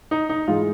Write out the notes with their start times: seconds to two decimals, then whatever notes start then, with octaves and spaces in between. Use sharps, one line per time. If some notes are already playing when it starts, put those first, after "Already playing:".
0.11 D#4
0.29 D#4
0.47 G#2 E3 G#3 F4